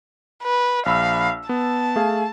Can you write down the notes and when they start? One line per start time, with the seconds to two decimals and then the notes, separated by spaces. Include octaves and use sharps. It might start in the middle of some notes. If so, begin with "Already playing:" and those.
0.43 B4
0.86 A#1 F5 B5 E6
1.49 B3 A5
1.96 A3 G#4 F5